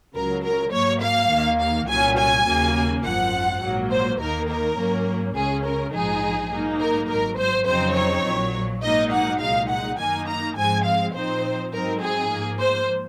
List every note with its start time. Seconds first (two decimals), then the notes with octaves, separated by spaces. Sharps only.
0.15 C#2 C#3 F#3 A#4
0.44 A#4
0.73 G#2 F#3 A#3 C#5
1.02 F5
1.30 D#2 D#3 A#3
1.60 F5
1.88 C2 A#2 F#3 C#4 G#5
2.18 G#5
2.46 D#2 C#3 F#3 A#3
3.05 G#1 F#2 F3 F#5
3.62 A#1 G#2 F#3 A#3
3.91 C5
4.20 D#2 D#3 A#3 D#4 A#4
4.49 A#4
4.78 G#2 F#3 A#3 C#4
5.36 C#2 C#3 G#3 C#4 G#4
5.65 A#4
5.93 A#1 G#2 F3 G#3 D#4 G#4
6.52 G#2 F#3 A#3 D#4
6.81 A#4
7.10 G#1 G#2 F#3 A#4
7.39 C5
7.67 F2 C#3 F#3 C4 D#4 C5
7.97 C#5
8.25 A#1 A#2 F#3
8.83 G#2 F#3 A#3 D#4 D#5
9.12 F#5
9.41 C2 A#2 G#3 D#4 F5
9.70 F#5
9.99 F#2 D#3 A#3 D#4 G#5
10.28 A#5
10.57 G#2 F3 G#3 C4 G#5
10.85 F5
11.15 A#2 F3 C4 D#4 C5
11.73 G#2 F#3 C4 D#4 A#4
12.02 G#4
12.30 G#2 F3 A#3
12.60 C5